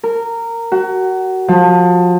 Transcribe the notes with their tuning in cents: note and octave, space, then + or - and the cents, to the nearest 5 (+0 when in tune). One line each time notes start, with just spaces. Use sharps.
A#4 -15
F#4 +25
F3 +30